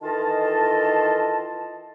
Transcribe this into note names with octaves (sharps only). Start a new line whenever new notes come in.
D#3 E3 F4 A4 D#5 A5